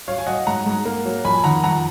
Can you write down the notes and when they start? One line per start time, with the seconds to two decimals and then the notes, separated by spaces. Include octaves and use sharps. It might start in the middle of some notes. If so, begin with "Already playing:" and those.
0.07 F#3 C#5 F5
0.18 G#5
0.27 F#3 D#5 F#5
0.47 G#2 F#5 A#5
0.66 G#2
0.85 A#3
1.05 F#3
1.24 F2 G#5 B5
1.44 D#3 F#5 A#5
1.64 F2 F#5 A#5